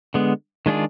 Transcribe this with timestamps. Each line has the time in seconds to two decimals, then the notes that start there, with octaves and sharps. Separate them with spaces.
0.14 D3 G#3 B3
0.66 D#3 G#3 D4 F4 G#4